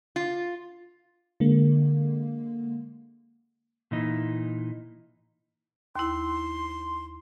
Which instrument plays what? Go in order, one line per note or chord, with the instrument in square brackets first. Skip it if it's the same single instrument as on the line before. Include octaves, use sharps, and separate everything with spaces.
[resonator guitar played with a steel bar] F4
[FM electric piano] D3 G#3 A#3
[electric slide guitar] A#2 E3 D#4
[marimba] D#2 E4 [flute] C6